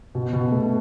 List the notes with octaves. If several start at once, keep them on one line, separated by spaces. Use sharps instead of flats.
B2
B2
A3